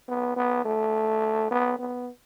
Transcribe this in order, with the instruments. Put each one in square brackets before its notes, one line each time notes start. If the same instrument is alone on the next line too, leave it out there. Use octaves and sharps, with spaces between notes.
[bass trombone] B3
B3
A3
B3
B3